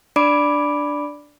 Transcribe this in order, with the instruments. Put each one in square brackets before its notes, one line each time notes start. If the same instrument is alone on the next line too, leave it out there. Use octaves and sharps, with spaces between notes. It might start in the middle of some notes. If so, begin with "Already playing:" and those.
[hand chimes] D4 D5 B5 D6 D7